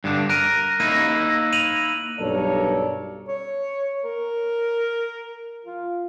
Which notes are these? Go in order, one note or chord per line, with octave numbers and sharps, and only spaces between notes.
G2 D3 D4
A#4 F#6 D7 D#7
A#3 D#4 E4 D#7
D#7 F7 F#7
B1 G2 A4 A#4 C#5 D5
C#5
A#4
F4